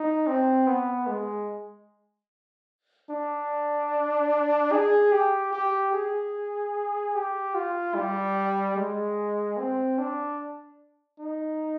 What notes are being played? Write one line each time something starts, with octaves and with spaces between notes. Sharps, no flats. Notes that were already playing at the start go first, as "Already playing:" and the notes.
Already playing: D#4
C4
B3
G#3
D4
G#4
G4
G4
G#4
G4
F4
G3
G#3
C4
D4
D#4